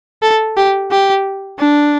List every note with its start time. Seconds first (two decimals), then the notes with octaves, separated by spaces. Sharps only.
0.23 A4
0.57 G4
0.91 G4
1.59 D4